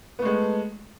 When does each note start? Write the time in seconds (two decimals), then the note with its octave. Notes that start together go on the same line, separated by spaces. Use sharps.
0.19 B3
0.22 A3
0.25 G#3